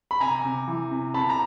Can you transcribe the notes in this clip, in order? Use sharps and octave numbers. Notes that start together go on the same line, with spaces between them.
B5
C3 G#5 A#5
C3
E3
C3
C3 A5 B5
A#5